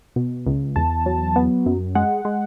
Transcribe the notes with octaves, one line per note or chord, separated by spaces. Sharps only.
B2
C#2
E2 A5
F#3
B3
F#2
G#3 F#5
G#3